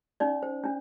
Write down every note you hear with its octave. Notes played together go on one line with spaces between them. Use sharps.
C#4 D#4 D5
C5
C#4 D4